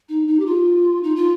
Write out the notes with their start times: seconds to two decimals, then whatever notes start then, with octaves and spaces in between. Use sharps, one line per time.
0.09 D#4
0.27 D#4
0.40 G4
0.46 F4
1.03 D#4
1.16 F4